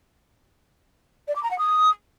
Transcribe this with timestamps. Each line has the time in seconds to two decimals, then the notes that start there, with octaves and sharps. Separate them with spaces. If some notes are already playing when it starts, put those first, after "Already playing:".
1.28 D5
1.35 D6
1.43 A#5
1.50 F#5
1.58 D#6